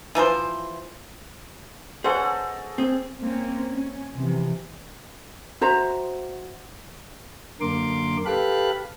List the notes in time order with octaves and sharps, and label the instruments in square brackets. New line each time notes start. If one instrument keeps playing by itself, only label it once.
[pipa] E3 F3 A#4 C5
[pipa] B3 C5 [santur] C#4 A4 D#5 [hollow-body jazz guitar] G#4 F#5
[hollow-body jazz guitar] C4 G#4
[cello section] A#3 C4 C#4
C#4
C3 E3 F3
[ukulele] F#4 C5 E5 A#5
[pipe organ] F#2 D3 A#3 A#4 C6 D6
G4 A4 B4 F5 B5 F#6